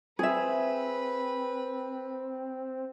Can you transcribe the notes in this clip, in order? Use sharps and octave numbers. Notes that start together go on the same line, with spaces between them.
C4 G#4 B4 E5